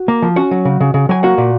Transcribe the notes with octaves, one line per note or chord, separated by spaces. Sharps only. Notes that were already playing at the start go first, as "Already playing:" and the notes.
Already playing: F#4
A#3
F3
C#4 F#4 F#5
F#3
C#3
C#3
C#3
F#3 G#5
A#3 F#4 F#5
A#2